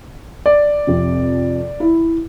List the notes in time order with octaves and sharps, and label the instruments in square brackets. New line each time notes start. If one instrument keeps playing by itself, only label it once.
[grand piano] D5
[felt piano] F2 C3
E4